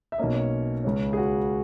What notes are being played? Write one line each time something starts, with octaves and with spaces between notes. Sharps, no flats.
E5
B1 B2 A#3 C#4 D#5
C#5
C#2 C#3 G#3 C#4
G#4
F#4